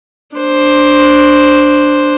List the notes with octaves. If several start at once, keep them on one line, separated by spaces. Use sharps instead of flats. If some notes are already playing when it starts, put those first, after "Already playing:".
D4 C5